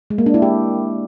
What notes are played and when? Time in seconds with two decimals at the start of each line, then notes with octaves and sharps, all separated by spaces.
0.10 G#3
0.18 A#3
0.26 D4
0.34 E4
0.42 G4